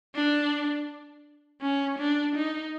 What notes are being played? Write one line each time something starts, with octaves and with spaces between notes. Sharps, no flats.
D4
C#4
D4
D#4